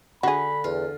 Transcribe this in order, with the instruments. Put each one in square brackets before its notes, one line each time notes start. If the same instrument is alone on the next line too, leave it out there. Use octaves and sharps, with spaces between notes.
[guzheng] D3 [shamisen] F#4 G#4 [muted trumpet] B5
[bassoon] E2 [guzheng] F4